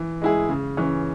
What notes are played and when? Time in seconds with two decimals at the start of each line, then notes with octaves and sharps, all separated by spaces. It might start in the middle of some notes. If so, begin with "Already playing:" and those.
Already playing: E3
0.22 G#3 E4 G#4
0.49 C#3
0.77 E3 C#4